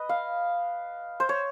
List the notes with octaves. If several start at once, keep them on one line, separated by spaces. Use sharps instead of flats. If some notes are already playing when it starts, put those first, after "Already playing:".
Already playing: B4 D#5
F5
C5
C#5